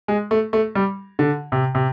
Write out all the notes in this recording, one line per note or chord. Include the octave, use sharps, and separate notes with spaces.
G#3
A3
A3
G3
D3
C3
C3